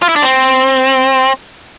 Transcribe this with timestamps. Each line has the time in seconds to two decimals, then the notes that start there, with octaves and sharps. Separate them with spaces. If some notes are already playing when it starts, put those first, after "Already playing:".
0.02 F4
0.09 E4
0.16 D4
0.23 C4